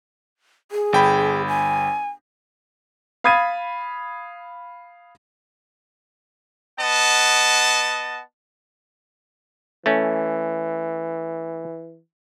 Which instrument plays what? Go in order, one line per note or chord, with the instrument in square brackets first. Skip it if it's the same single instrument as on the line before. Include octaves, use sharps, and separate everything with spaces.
[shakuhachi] G#4
[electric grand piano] G1 G5 B5
[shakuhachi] G#5
[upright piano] F5 B5 D#6 G#6 A6 D#7
[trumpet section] B3 D#5 F#5 A5
[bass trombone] E3 [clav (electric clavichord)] A3 C#4